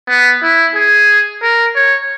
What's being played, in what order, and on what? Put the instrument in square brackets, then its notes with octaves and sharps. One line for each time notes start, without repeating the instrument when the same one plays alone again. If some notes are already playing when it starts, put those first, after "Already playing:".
[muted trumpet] B3
E4
G#4
A#4
C#5